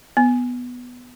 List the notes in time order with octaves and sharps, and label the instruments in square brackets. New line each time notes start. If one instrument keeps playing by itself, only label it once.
[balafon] B3